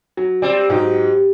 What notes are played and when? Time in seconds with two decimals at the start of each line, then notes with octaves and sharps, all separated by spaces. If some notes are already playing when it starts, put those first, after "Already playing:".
0.17 F#3
0.42 G3 C4 D5
0.69 G#2 F#3 D#4 G4